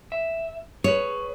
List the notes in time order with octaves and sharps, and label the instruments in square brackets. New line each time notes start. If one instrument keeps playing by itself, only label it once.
[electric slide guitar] E5
[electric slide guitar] G#4 B4 [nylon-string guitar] C#5